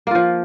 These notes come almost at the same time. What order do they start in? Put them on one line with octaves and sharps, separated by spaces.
A#3 F4 F3